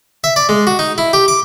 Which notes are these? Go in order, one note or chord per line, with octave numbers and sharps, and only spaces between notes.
E5
D5
G#3
F#4
D#4
E4
G4
D6